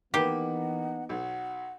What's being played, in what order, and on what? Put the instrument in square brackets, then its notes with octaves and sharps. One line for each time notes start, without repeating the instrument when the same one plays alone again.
[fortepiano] D#3 A#3 B4 [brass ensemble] E3 B3 D#4 [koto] G4 [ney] F#5
[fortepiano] B1 [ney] F#5